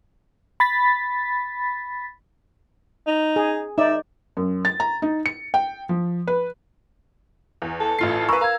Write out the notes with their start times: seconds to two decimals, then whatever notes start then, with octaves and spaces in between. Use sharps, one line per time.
0.60 B5 A6 B6
3.07 D#4
3.36 G#4
3.78 D#4 D5 E5
4.37 F#2
4.65 A6
4.80 A#5
5.02 D#4
5.26 C#7
5.54 G5
5.89 F3
6.27 B4
7.62 E2
7.80 A4 A5
7.99 A1 F4 C7
8.29 A#4 B4 G#5 B5 C#6 E6
8.41 A#4 F5 A#5 G#6